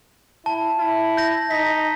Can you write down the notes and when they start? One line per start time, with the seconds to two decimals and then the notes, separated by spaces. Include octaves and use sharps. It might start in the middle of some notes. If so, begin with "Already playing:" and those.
0.46 E4 A5
0.79 E4
1.17 G6 A#6
1.51 D#4 B6